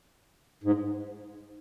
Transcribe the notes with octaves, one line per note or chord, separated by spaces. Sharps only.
G#2